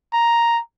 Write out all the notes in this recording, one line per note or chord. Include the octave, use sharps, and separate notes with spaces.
A#5